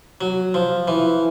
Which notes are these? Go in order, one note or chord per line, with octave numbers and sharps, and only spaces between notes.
F#3
F3
E3